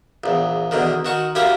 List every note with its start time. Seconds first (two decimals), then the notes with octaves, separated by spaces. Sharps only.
0.24 A#1 E2
0.71 E2 B2 D3 D#3
1.05 D#3 F#4 C#6
1.35 F#2 A#3 E4 G4 A#4